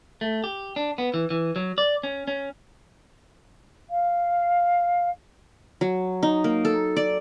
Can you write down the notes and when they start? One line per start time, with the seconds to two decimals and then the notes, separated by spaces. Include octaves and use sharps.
0.21 A3
0.44 G4
0.76 D4
0.98 B3
1.14 E3
1.30 E3
1.56 F#3
1.78 D5
2.03 C#4
2.28 C#4
3.90 F5
5.81 F#3
6.23 D#4
6.44 A#3
6.65 A4
6.97 D5